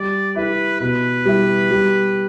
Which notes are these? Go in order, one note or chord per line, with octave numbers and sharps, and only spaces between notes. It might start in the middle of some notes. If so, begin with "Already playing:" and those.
Already playing: G3 D5
E4 G4 B4
B2 B4
G3 B3 E4
G3